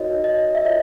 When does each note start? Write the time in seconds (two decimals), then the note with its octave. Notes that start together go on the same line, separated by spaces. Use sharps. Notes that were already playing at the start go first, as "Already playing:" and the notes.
Already playing: D#4 F#4 A#4 C#5 D#5
0.24 D#5
0.55 E5
0.65 F4 A#4 C#5 D#5